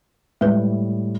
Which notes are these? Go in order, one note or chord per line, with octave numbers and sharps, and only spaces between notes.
A2 G3 G#3 B4